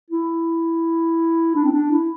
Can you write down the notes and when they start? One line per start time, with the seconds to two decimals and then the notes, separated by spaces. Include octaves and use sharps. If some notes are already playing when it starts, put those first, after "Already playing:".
0.10 E4
1.55 D4
1.64 C4
1.73 D4
1.91 E4